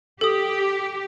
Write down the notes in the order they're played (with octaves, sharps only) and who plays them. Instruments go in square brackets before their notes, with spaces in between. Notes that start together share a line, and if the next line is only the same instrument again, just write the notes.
[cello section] G4 [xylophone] A4 D#6